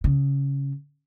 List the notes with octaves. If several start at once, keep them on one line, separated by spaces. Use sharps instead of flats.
C#3